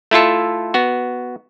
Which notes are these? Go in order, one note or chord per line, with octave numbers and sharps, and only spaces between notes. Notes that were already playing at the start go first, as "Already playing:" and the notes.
A3 E4 F4 A4
B3 F#4